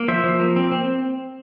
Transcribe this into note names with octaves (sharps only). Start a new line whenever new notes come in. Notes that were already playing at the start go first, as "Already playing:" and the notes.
Already playing: A#3
F3 C5 E5
F3
A#3
C4
C4